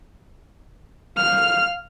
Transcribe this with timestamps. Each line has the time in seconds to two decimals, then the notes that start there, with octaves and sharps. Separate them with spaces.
1.17 F5 F6